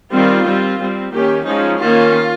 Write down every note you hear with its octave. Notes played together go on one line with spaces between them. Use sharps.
D#3 G3 C4 F4
G3 C4
G3 C4
D#3 A#3 C#4 G4
F3 G#3 C#4 D#4
D#3 A#3 C#4 F4